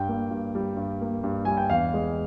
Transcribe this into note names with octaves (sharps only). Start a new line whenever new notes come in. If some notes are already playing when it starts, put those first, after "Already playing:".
Already playing: G2 G5
A#3
G2
G3
G2
A#3
G2
G3 G#5
G5
E2 F5
G#3